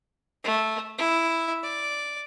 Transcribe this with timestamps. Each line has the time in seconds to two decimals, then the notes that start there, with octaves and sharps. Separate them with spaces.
0.43 A3
0.98 E4
1.62 D5